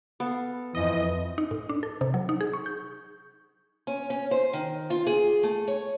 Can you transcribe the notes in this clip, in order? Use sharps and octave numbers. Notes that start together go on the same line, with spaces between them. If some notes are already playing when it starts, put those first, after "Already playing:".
B3 A4 F5
F2 E3 D#5
D#4
A2
D4
A4
C3
F#3
D#4
G#4
C#6
G6
C#4
C#4
C5
D#3
F4
G#4
A3
C#5